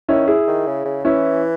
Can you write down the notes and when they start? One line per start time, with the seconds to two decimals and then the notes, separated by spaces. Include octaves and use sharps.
0.09 D#3 C#4 E4
0.28 E4 G#4
0.47 D#3
0.67 C#3
0.85 C#3
1.05 E3 C#4 E4